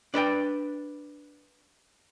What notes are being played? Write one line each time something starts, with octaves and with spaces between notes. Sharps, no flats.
D4 B4 D5 G5